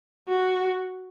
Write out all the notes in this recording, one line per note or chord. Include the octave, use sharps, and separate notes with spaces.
F#4